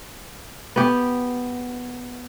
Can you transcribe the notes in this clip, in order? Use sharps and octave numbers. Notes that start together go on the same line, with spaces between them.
B3 G4